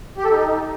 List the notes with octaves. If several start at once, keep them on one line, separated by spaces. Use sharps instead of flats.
G4
A4
D#4